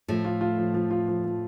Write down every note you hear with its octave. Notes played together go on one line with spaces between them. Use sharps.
A2 F3 A3
F4
F4
F3
F3
F4
F3
F3